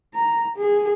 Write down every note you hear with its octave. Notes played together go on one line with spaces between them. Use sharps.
A#5
G#4